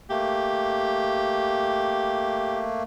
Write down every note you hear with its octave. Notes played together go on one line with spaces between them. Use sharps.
A3 A#3 G4